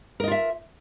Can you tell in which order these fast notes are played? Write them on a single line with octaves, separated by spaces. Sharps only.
A#4 D#5 F4 E5